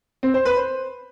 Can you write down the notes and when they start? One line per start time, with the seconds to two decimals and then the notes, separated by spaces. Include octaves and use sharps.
0.23 C4
0.34 C5
0.45 B4
0.57 C5